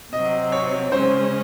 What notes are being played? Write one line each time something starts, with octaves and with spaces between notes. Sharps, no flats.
C3 F#3 C4 D#5
C#5
C#3 G#3 C#4 C5